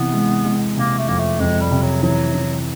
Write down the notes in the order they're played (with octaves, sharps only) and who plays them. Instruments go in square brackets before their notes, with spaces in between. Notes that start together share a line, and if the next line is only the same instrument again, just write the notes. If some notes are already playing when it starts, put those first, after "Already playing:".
Already playing: [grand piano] C3 E3 [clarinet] B3
[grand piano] G#3
G#3
[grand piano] C3 [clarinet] A#3
[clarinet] A3
[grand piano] F2 [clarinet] A#3
[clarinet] A3
[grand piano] F2 [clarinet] G#3
[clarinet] G3
[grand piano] C3
[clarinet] F#3
[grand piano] E3 [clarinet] F#3
[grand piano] E3